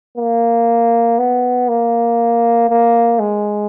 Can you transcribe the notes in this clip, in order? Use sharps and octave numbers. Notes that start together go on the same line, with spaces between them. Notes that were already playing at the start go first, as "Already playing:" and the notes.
A#3
B3
A#3
A#3
G#3